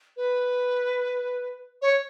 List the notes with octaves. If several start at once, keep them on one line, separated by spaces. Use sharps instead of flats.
B4
C#5